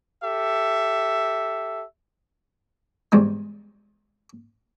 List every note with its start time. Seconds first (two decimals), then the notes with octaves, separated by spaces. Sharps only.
0.24 G4 A4 E5
3.12 E2 G#2 C3 G3 G#3